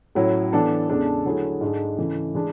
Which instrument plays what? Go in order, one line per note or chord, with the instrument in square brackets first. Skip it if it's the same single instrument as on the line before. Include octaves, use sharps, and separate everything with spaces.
[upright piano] A2 F#3 C#4 E4
E3 B3 D4 A4
E2 C#3 G#3 D4 A4
D3 F#3 A3 E4 G#4
G#2 G#3 D4 A4
C#3 E3 A3
E3 G#3 D4